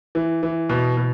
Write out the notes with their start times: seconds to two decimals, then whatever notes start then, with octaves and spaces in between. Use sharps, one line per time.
0.15 E3
0.43 E3
0.69 B2
0.97 B2